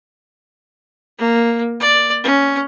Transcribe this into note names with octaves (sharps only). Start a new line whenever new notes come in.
A#3
D5
C#4